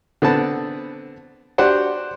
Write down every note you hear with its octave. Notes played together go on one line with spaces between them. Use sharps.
D3 B3 C4 A5
D4 F#4 G4 C5 F#5